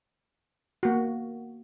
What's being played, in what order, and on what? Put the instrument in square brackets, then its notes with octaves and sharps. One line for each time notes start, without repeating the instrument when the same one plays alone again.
[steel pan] A#3 F#4